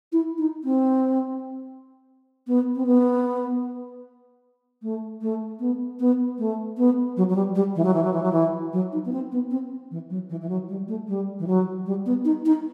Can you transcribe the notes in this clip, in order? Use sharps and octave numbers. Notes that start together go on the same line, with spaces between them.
E4
D#4
C4
B3
C4
B3
A3
A3
B3
B3
A3
B3
F#3
F#3
G3
G3
E3
F#3
E3
F#3
E3
F#3
E3
F#3
D#4
B3
C4
B3
C4
E3
F#3
E3
E3
F#3
G3
A3
G3
E3
F#3
G3
B3
D#4
D#4